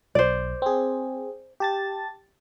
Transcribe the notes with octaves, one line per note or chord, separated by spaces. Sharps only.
B1 C5 D5
C4 G#4
G4 A5 A6